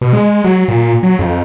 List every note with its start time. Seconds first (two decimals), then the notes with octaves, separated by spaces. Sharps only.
0.01 B2
0.13 G#3
0.44 F#3
0.68 A#2
1.03 F#3
1.19 F2